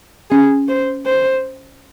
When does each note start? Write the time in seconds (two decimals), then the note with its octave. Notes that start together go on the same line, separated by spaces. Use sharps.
0.31 C#4 G#4
0.68 C5
1.06 C5